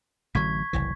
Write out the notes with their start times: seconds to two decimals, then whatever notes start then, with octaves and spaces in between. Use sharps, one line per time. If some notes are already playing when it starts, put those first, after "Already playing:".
0.35 A1 D3 F#3 C#6 G#6 B6
0.73 F#1 C2 E3